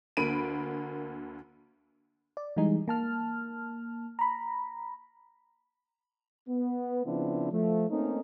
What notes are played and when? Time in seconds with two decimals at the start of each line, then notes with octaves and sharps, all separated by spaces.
0.17 D2 D3 A#3 B5 D7 D#7
2.37 D5
2.57 E3 G3 G#3 D#4 G#4
2.88 A#3 A5 F6
4.19 A#5 B5
6.49 B3
7.05 C#3 F3 B3 C4 D4 E4
7.51 F3 A3
7.90 A3 A#3 C4 C#4 D#4